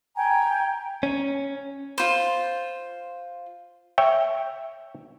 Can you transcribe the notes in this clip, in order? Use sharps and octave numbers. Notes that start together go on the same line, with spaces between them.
G5 G#5 A#5
C#4
F4 C5
C#5 E5 G5